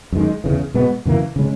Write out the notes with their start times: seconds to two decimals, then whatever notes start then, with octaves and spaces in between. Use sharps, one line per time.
0.12 F#2 D#3 G#3
0.44 E2 C#3 E3
0.74 B2 G#3 B3
1.05 F#2 C#3 E3 A#3
1.36 C#3 G#3 C#4